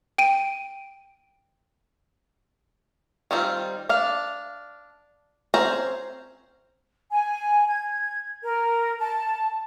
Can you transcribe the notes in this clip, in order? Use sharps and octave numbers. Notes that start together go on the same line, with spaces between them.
G5 D7 D#7
D#3 G3 C4 F4
D4 F5
C4 C#4 C5 A#5
G#5
G#6
A#4
A5